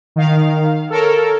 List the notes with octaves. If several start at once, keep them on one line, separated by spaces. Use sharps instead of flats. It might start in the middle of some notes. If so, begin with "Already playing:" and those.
D#3 F5
A4 A#4 C#5